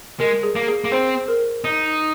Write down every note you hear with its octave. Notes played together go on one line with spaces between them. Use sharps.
G#3 A#4
G#4
A#3
G#4
A#3
C4 C5
A#4
D#4